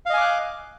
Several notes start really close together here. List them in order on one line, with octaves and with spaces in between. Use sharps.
F5 D#5 G#5 D6 F#6